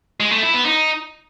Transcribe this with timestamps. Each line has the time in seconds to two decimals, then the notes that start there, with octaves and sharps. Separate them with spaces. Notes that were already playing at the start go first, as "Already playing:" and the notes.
0.20 G#3
0.32 A3
0.43 E4
0.54 B3
0.65 D#4